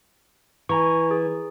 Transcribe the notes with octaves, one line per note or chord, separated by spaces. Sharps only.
E3 G#5 A#5 C#6
G#4